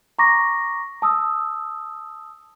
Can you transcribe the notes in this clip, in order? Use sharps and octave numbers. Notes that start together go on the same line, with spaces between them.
A#5 C#6 D6 A#6
A5 D#6 E6